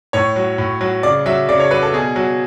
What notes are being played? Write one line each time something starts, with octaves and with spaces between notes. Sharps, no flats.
A2 C#5
F#3
A2
F#3
C#3 D5
F#3 E5
C#3 D5
C#5
F#3 B4
A4
B2 G#4
F#3